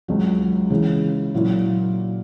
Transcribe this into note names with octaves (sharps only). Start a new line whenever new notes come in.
C#2 C#3 F#3
C#3 E3 G#3
A#2 F#3 A#3 E4